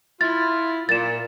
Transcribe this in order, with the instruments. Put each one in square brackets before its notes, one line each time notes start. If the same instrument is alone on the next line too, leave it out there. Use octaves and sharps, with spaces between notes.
[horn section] E4 F4 [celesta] A6
[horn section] A#2 [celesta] A6 E7